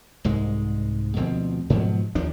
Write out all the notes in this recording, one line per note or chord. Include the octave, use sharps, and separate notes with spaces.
C2 G#2 G#3
D2 B2 F3 C4
G#2 B2 F3 F#3
D#2 D#3 F3 D4